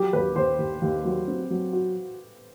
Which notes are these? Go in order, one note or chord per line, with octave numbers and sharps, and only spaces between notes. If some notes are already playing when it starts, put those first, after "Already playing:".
Already playing: F#3 G4
D#2 B4
D#2 C5
D#2
D#2
F#3
C4
F#3
F#4